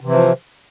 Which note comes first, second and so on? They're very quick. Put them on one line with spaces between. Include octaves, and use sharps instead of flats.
C3 E3 F3